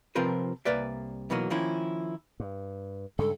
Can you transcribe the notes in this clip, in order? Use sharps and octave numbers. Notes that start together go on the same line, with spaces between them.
C3 F3 C4 F4 A#4 B4
C2 A#3 B4 D5 E5
B2 E3 F#3 A#3 D#4
D#3 F3 A#3 C#4 E4
G2
G2 C#3 G#3 A4